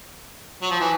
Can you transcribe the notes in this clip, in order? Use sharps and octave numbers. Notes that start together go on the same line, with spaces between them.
F#3
F3
E3